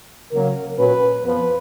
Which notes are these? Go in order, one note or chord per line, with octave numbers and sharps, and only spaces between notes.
C#3 F#3 A#3 A#4
A#2 F#3 C#4 B4
F2 F3 B3 B4